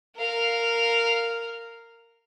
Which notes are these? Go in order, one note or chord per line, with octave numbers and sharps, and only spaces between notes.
A#4 F5